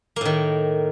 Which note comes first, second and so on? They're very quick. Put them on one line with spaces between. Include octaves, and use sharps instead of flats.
A#3 A2 D#3